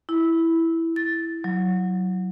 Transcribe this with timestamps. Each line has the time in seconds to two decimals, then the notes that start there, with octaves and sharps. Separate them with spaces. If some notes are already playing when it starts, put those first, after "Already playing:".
0.09 E4
0.96 A6
1.44 F#3